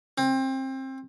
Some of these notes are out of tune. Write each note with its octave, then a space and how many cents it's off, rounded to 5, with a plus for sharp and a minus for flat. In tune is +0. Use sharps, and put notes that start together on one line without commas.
C4 +25